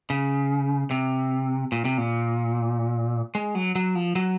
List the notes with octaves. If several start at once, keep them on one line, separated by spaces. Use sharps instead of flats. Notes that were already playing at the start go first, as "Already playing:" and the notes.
C#3
C3
A#2
C3
A#2
G#3
F#3
F#3
F3
F#3